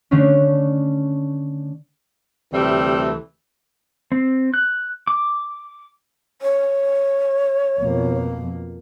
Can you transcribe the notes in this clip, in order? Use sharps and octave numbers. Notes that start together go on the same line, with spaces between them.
D3 A3 C#4 D4
D2 C3 E3 G3 A3
C4
F#6
D6
C#5
F2 B2 A#3